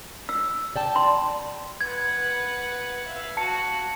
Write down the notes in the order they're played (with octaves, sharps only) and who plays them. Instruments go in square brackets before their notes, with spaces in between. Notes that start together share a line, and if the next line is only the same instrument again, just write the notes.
[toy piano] E6
[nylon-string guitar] D5 G5 A5
[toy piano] C6
[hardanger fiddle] B4 F#5 [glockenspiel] G#6
[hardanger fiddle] E5 F5
[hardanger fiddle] F#4 [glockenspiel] A5 C#7